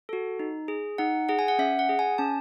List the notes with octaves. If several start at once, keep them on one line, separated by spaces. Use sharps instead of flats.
F#4 A4
D#4
G#4
D#4 F#5
G#4 F#5
G#5
F#5
C#4 E5
F#5
G#4
G#5
C#4 A5